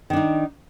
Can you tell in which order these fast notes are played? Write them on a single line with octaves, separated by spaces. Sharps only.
D#3 D4 D#4